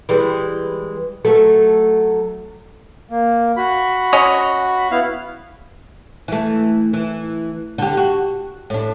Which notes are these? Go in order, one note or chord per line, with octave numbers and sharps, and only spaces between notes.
E3 G3 G#3
F#3 A3 A4
A#3
F#4 B5
C#4 C#5 D#5
B3 E4 F5
E3 A3
E3
D3 G4
F#4
A2 D4